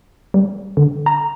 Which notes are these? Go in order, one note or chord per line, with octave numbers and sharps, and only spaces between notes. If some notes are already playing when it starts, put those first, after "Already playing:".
G3
D3
A#5